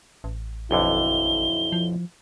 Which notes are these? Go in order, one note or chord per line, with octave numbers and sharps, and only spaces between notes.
A1
B1 F2 D3 E4 G7
F3